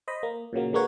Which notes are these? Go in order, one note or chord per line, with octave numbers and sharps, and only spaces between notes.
C5 D#5 B5
A#3
A#2 C#3 F#3 A#3
D3 G#3 A#3 B3 F#4 C#5